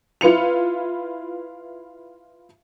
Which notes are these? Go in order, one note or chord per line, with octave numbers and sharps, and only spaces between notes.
E4 F4 B4 C#7 F7